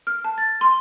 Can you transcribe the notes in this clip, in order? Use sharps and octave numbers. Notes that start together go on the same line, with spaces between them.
F6
A5
A6
C6